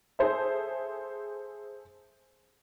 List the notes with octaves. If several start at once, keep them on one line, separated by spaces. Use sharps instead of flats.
G#4 A4 C5 E5